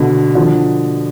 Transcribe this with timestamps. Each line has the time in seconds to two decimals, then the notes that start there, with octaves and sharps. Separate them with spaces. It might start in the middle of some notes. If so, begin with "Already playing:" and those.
Already playing: B2 D3
0.35 D3 F3